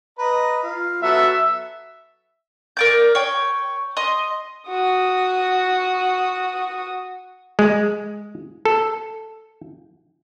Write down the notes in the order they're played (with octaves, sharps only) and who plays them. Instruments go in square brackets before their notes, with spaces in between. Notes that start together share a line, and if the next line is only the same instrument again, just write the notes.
[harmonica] B4 D#5 A#5
F4
[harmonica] F#3 B3 A4 [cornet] E5
[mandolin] A#4 D5 G6
C#5 G5
D#5 C6
[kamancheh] F#4 D#6
[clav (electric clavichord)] G#3
A4